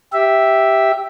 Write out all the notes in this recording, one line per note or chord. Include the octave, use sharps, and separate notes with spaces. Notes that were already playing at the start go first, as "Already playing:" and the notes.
G4 E5